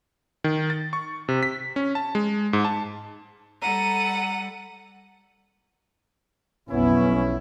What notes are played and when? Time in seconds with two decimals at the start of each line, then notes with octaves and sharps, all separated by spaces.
0.44 D#3
0.70 A6
0.93 C#6
1.28 C3
1.43 B6
1.76 C#4
1.95 A5
2.15 G#3
2.53 G#2
2.65 A5
3.62 G3 A4 F#5 A#5 D#7
6.70 B1 F2 B3 C#4 E4